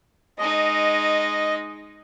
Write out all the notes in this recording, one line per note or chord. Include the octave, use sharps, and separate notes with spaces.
G#3 D#4 D#5